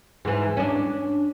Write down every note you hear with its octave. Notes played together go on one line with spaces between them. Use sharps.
G#2 E3
C#4 D4